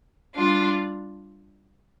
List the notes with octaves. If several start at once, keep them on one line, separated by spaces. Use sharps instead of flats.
G3 D4 F4